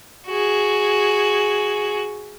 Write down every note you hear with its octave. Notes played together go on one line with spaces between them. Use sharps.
F#4 G#4